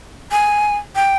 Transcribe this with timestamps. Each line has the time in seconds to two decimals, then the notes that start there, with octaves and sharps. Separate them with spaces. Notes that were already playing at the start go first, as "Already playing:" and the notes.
0.32 G#5
0.96 G5